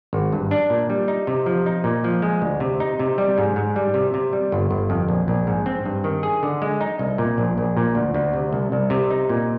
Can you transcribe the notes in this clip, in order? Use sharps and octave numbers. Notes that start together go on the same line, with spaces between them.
G#1
G2
D4
A#2
G3
D#4
C3
F3
D#4
A#2
F3
G#3
D2
C3
D#4
C3
G3
G#2
G#2
G3
C3
C3
G3
G1
G1
F2
A#1
A#1
G#2
C4
G2
D#3
G#4
D3
G#3
D#4
C2
A#2
A#1
A#1
A#2
D2
D2
C3
C2
C2
C3
D#4
A#2